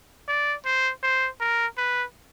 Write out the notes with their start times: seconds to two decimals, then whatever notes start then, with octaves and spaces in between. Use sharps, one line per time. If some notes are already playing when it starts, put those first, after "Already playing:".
0.29 D5
0.65 C5
1.03 C5
1.41 A#4
1.78 B4